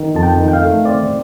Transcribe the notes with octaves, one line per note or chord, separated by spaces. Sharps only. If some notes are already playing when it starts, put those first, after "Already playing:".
Already playing: D#3
F2 A5
G5
D#3
G5
F5
A3
C4 D5